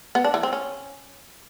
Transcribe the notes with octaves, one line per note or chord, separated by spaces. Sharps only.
B3
D4
E3
C4
C#4